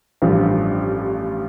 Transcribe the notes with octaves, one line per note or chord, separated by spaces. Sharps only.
A1 G2 F3 G4